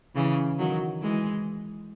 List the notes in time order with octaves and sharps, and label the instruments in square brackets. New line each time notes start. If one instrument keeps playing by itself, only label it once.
[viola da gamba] C#3 E3
D#3 F#3
E3 G#3